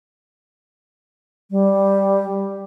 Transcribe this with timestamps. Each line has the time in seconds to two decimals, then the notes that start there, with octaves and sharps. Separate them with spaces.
1.51 G3